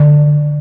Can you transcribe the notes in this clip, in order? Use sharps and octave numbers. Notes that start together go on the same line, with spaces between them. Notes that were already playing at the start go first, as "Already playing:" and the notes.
Already playing: D3